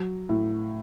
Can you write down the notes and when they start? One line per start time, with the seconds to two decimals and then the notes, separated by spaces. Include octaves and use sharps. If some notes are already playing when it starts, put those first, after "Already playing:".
Already playing: F#3
0.29 A2